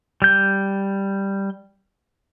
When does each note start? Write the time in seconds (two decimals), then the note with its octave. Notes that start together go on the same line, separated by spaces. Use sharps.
0.22 G3 G6